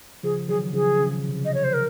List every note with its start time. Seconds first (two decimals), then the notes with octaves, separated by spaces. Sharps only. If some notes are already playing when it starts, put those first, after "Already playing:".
0.23 C#3 F3 G#4
0.48 D#3 F#3 G#4
0.73 C#3 F3 G#4
0.98 C#3
1.28 C3
1.36 C#3
1.45 D#5
1.54 C#5
1.64 C5
1.74 A#4